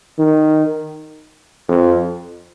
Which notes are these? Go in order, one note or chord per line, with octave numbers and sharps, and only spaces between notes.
D#3
F2